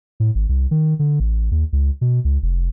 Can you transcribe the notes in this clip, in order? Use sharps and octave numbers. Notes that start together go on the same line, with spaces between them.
A2
G#1
C2
D#3
D3
A1
D#2
C#2
B2
C#2
F1